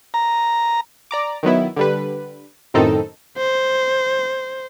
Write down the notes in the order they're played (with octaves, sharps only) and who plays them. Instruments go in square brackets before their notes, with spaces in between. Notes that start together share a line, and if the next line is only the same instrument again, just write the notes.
[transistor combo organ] A#5
[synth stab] D5 A#5 D6
D#3 F#3 B3 E4
D3 G3 B4
F#2 A2 D#3 C4 D#4 A4
[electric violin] C5